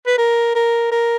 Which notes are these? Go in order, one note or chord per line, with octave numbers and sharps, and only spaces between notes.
B4
A#4
A#4
A#4